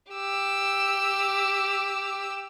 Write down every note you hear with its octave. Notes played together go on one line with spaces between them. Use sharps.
G4 E6